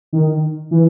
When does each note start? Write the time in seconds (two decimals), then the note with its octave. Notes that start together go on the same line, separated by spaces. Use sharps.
0.13 D#3
0.71 E3